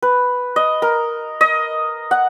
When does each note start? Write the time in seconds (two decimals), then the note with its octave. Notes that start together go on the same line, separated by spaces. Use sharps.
0.02 B4
0.56 D#5
0.82 A#4
1.41 D#5
2.11 F#5